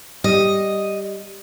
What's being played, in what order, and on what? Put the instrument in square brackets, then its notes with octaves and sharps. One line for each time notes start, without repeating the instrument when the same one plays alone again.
[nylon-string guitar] G3 [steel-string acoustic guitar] D#5